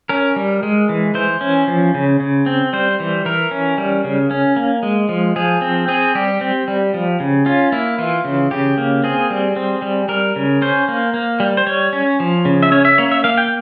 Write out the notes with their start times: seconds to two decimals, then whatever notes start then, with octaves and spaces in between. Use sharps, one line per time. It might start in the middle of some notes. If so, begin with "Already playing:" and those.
0.09 C#4 A#4
0.36 G3
0.63 G#3
0.89 E3
1.15 E3 C5
1.41 C#4
1.67 F3
1.94 C#3
2.20 C#3
2.46 C4
2.73 G3 C5
3.00 E3
3.25 E3 A#4
3.51 C#4
3.78 G3
4.04 C#3
4.31 C#4
4.56 A#3
4.83 G#3
5.09 F3
5.36 F3 G#4
5.61 C4
5.88 C4 G#4
6.15 G3 G4
6.41 C4
6.68 G3
6.94 F3
7.20 C#3
7.46 C#4 F4
7.72 A#3 E4
7.98 E3 F4
8.24 C#3
8.51 C#3 G4
8.78 A#3
9.04 C4 G#4
9.30 G3
9.56 C4
9.82 G3
10.09 G3 A#4
10.36 C#3
10.62 C#4 C5
10.88 A#3
11.14 A#3
11.40 G3
11.57 C5
11.67 G3 C#5
11.93 C#4
12.20 F3
12.45 C#3
12.63 E5
12.72 C#4 C#5
12.85 E5
12.98 A#3 C#5
13.11 E5
13.24 A#3 F5
13.38 G5